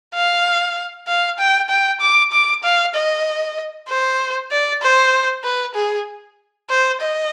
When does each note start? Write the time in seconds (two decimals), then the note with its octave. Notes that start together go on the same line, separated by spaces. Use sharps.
0.14 F5
1.08 F5
1.39 G5
1.69 G5
2.01 D6
2.32 D6
2.63 F5
2.94 D#5
3.89 C5
4.51 D5
4.82 C5
5.44 B4
5.75 G#4
6.70 C5
7.01 D#5